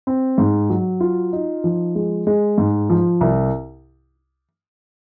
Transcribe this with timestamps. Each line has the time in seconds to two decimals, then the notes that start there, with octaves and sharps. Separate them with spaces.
0.07 C4
0.38 G#2
0.70 F#3
1.00 F4
1.33 D#4
1.64 F3
1.95 G#3
2.27 G#3
2.58 G#2
2.90 F3
3.21 C2